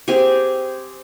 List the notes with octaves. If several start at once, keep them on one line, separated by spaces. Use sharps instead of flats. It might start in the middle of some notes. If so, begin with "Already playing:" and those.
C4 G4 G#4 G#5